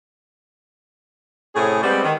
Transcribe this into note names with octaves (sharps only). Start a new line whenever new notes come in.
A2 C3 C#4 G#4
G3 G#3 B3 C4
D#3